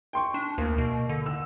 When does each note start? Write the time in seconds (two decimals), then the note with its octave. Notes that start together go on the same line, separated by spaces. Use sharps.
0.13 G5 C6 C#6
0.34 D4
0.58 D2 A#3
0.78 B2
1.09 D3
1.26 E6